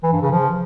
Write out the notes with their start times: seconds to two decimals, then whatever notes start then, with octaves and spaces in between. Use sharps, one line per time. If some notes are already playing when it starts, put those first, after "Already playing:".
0.03 E3
0.13 G2
0.22 C#3
0.31 F3